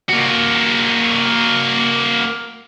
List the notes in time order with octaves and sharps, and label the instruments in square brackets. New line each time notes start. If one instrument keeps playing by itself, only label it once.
[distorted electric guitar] A#3 F#4